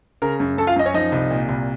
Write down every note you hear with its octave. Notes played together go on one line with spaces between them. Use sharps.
C#3 A#4 A#5
F#2
F#2 A4 A5
F4 F5
F#2 D#5
C#4 C#5
F3 D#4 D#5
C2
A#2
C2